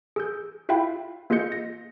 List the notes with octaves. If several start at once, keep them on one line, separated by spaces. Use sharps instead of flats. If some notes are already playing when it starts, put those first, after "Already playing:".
G#4 E6 G6
E4 F4 E5 F5 G5 B5
A#3 F4 G#4 D#5 G6 C#7
A#6